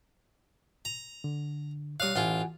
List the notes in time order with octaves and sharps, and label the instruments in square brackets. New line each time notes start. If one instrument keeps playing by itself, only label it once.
[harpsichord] A#5
[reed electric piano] D3
[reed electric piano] G3 C#5 F#6 [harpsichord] F5 D#6
[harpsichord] A1 F4 [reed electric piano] F#5 G#5